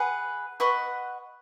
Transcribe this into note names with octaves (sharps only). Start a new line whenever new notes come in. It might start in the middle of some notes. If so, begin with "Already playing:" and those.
Already playing: G#4 B4 F#5
B4 D#5 F#5 C#6